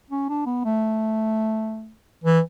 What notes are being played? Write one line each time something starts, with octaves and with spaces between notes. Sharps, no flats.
C#4
D4
B3
A3
E3